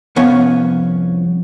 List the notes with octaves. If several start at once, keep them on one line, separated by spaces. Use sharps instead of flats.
C2 F2 B3 C#4 C#5 F5